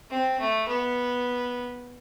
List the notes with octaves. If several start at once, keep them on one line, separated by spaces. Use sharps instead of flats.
C4
A3
B3